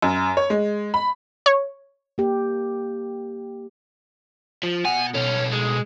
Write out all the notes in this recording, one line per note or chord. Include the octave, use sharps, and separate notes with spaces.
F#2
C#5
G#3
B5
C#5
A#3 G4
F3
B2 F#5 G#5
B2 C#4 A4
G#3